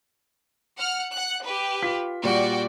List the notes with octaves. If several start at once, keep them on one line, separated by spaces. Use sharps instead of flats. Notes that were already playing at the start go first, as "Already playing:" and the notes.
F#5 F6
F#5 F#6
G4 B4
F4 B6
A#2 G3 F#4 D5 G5